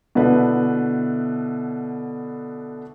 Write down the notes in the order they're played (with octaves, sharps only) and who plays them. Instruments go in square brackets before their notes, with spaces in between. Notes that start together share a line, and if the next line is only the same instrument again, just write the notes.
[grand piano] B2 D3 E4 B4